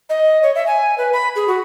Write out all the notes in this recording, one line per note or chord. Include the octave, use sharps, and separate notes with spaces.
D#5
C#5
E5
G#5
B4
B5
G#4
F#4